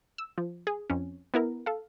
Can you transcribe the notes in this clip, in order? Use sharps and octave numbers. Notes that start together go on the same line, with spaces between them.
E6
F3
G#4
F2 C#4
B3 E4 A#4
A4 F5